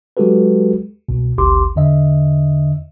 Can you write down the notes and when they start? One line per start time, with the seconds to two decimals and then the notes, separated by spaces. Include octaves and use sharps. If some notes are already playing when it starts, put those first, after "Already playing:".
0.17 F#3 G#3 F#4 G4 A4 B4
1.09 C2 B2
1.38 G#1 D2 G4 C6 D6
1.76 E2 D3 D#5 E5